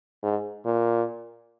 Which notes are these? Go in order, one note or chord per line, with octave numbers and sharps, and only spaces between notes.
G#2
A#2